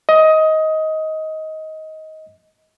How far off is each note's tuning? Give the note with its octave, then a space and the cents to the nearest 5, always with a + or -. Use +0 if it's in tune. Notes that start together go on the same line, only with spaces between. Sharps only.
D#5 +15